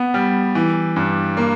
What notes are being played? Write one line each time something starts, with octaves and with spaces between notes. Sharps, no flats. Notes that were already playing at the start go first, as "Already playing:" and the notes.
Already playing: B3
G3
E3
G2
A#3